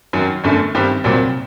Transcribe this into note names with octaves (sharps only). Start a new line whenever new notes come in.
F#2 D#3 F#3
G1 F#2 D3 A3
G2 D#3 G3 C4
C2 A#2 F#3 C4